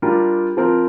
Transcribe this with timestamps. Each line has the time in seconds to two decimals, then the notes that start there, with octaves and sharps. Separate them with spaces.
0.02 G3 D4 F4 A#4
0.57 F3 C4 F4 A#4